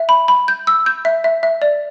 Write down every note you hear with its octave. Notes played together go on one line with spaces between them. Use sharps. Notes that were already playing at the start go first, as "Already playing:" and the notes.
Already playing: E5
B5
B5
G6
E6
G6
E5
E5
E5
D5